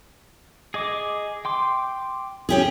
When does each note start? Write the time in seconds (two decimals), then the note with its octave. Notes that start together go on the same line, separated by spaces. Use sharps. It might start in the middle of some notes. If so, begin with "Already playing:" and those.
0.74 G#4 D#5 D6
1.45 G5 C6 D6
2.49 C#4 G4 G#4